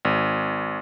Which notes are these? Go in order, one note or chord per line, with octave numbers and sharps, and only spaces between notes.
G#1